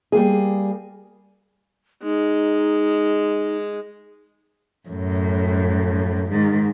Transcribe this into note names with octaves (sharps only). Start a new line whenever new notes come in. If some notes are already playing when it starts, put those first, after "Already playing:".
G3 A#3 G#4
G#3 D#4
F#2 A2
G#2 D#3